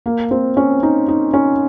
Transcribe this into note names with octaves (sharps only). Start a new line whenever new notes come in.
A#3
C4
C#4
D#4
D#4
C#4